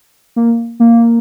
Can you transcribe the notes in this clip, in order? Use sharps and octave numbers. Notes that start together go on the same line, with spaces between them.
A#3
A#3